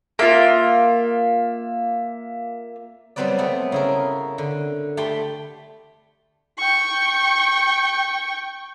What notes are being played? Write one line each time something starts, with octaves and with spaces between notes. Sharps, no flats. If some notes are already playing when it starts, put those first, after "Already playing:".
A#3 F4 E5
F#3 G3 B3 C4 B4 D5
A3 B3 C4
C#3 E4 A#4
D3
A3 G4 G5 B5 C6
G5 C#6